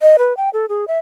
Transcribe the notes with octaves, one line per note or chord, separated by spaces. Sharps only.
D#5
B4
G5
A4
G#4
E5